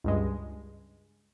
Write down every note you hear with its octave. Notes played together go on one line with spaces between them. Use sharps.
C#2 G2 G#3